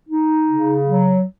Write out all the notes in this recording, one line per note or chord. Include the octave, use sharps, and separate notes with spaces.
D#4
C#3
F#3